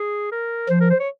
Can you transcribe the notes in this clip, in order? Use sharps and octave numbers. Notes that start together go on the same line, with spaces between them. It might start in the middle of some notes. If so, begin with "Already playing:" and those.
Already playing: G#4
A#4
F3 C5
A#4
C5
C#5